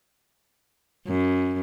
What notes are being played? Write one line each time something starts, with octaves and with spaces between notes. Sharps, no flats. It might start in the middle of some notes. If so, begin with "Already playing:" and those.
F#2